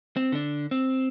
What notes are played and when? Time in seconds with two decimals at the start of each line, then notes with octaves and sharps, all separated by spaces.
0.16 C4
0.32 D3 D4
0.71 C4